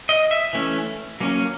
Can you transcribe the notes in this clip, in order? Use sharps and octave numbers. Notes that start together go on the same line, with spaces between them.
D#5
E5
E3 A3 C#4
F#3 A#3 C#4